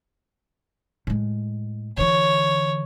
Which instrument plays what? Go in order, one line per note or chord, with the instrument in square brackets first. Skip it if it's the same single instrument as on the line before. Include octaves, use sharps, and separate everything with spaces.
[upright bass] A2 G#3
[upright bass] D3 E3 [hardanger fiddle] C#5